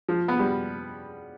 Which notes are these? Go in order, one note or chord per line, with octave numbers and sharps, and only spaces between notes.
F3
B3
G3